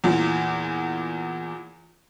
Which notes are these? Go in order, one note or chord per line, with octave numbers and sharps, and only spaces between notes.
E2 A#2